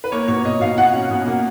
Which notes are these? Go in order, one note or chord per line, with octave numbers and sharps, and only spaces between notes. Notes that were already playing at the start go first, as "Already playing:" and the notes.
B4
A#3 C#5
B2 C#5
B2 D#5
B2 F5
B2 F#5
C#4
B2
A#3